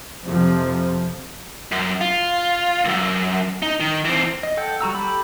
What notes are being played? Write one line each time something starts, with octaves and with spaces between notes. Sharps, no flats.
F2 C3 F3
F#2
F4
C2 F#2
D#4
D#3
E3 C4
D#5
A4 F#5 G5
G3 F#4 A#5 E6
G4 A4 B5